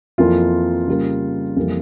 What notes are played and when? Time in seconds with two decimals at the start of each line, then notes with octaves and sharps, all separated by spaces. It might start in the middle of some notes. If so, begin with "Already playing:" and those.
0.18 F2 E3 A#3 F4
0.88 C#3 G3 A#3
1.57 F2 E3 G3 A#3